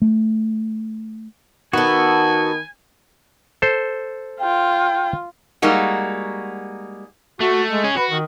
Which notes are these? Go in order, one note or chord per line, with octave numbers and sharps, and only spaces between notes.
A3
D#3 B3 F#4 A4 B4 G#5
A4 C5
F4 G5
G3 G#3 A#3 D#4 F#4
A3 F#4
G#3
C#4 G#4
F#4 B4
D#3